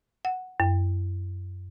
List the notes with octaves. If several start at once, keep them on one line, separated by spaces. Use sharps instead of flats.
F#5
F#2